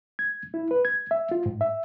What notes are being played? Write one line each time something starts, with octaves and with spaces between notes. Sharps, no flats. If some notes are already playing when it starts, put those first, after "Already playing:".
G#6
E4
B4
G#6
E5
F4
G#2
E5